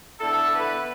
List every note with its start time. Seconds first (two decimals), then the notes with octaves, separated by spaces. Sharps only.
0.20 D3 B3 E4 A4
0.50 B4